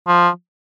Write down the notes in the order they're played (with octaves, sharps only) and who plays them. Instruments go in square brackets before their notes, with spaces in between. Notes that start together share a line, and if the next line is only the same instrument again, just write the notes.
[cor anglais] F3